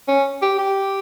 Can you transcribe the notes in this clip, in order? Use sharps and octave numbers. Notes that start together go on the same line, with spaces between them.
C#4
G4
G4